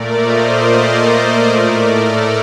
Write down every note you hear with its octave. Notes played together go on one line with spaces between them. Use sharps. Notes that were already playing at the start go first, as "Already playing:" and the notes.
Already playing: A#2 A3 A#4 D5
C5 D#5
A#4 D5
A2 A3
A4